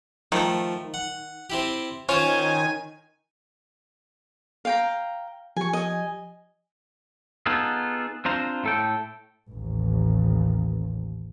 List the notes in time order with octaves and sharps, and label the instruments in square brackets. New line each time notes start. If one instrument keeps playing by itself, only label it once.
[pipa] D#3 [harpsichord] F3 A3
[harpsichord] F#5
C4 E4 G4
[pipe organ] D#3 G#5 [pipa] C#4 [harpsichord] F4 C5
[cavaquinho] F5 G5 A#5
[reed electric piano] F3 G4 [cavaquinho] G#5 C#6
[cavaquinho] D#5 G#5
[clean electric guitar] B3 D#4 F4 G#4 A4
C4 D4 F4 C5 A#5
A2 A4 G5
[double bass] A1 D#2